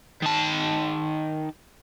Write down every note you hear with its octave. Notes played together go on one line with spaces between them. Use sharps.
D#3 A5